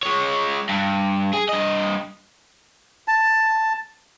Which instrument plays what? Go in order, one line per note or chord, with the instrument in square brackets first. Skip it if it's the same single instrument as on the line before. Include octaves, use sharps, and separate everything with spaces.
[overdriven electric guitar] G#3 C#5
G2
G#4
G2 D#5
[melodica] A5